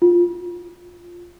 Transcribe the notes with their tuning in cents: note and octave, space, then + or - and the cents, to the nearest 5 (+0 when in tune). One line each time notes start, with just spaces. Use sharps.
F4 +5